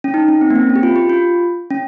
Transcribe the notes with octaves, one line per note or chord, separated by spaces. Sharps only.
C#4
D#4
C#4
C4
A#3
C4
C#4
G4
F4
G4
F4
C#4